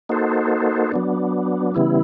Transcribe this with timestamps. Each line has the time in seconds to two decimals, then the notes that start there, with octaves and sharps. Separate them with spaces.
0.09 A#3 D#4 F#4 A4 C5
0.92 F#3 B3 D4
1.75 C#3 E3 G3 B3 E4